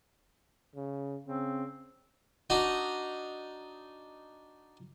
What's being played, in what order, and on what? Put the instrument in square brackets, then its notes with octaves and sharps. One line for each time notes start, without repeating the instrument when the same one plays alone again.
[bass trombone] C#3
[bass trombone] C#3 [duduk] C4
[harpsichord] D4 D#4 F#4 A#5